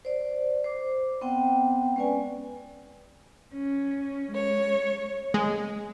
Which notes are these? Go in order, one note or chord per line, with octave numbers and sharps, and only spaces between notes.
C5 D5
C5 D6
B3 C4 F#5 G5
G#3 C#4 B4 D5 G#5
C#4
G#3 C#5
G#3